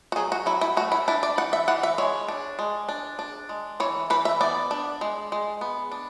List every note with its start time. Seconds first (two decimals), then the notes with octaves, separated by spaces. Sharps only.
0.12 F#4
0.16 F#3 G#4
0.32 F#4
0.46 F#3 E4
0.61 E4
0.77 A3 F#4
0.92 E4
1.08 D4 E4
1.23 D5
1.38 E3 F#5
1.53 E5
1.68 E3 F#5
1.83 E5
1.98 G#3 C#5
2.28 D4
2.59 G#3
2.89 D4
3.19 D4
3.49 G#3
3.80 E3 C#5
4.10 E3 B4
4.25 E5
4.41 B3 D5
4.71 D4
5.01 G#3
5.32 G#3
5.61 B3
5.91 D4